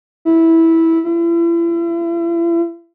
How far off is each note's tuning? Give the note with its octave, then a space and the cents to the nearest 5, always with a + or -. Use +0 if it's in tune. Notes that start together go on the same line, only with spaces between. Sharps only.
E4 -10
E4 +40